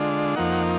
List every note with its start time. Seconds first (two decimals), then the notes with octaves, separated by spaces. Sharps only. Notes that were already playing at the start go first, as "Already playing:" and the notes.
Already playing: D3 G#3 D4 F4
0.36 F2 F3 A#3 D#4 F#5